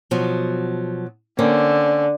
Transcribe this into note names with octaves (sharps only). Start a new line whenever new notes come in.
B2 F3 F#3
D3 A#3 C4 C#4